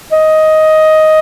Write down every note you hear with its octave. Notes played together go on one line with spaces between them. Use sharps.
D#5